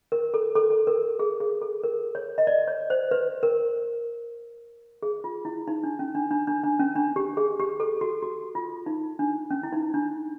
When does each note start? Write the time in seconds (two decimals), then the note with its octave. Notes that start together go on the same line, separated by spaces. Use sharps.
0.12 A#4
0.34 A4
0.55 A4
0.70 A4
0.87 A#4
1.19 G#4
1.40 G#4
1.62 A4
1.83 A#4
2.15 C#5
2.38 D#5
2.47 D5
2.68 C#5
2.90 C5
3.11 B4
3.43 A#4
5.02 G#4
5.24 F4
5.45 E4
5.68 D#4
5.84 D4
5.99 C#4
6.15 D4
6.31 D4
6.47 D4
6.64 D4
6.80 C#4
6.96 D4
7.16 G4
7.37 G#4
7.60 G4
7.80 A4
8.01 F#4
8.22 F#4
8.55 F4
8.86 D#4
9.19 D4
9.51 C#4
9.63 E4
9.72 D#4
9.94 D4